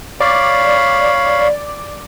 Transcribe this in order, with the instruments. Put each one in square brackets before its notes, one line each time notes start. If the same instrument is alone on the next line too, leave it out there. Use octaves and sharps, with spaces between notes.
[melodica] C#5 F5 B5 [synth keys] D5